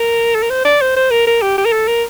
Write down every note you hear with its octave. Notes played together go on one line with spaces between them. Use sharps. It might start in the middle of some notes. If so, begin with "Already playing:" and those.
Already playing: A#4
A4
A#4
C5
D5
C5
C5
A#4
A#4
G4
G4
A#4
A4
A#4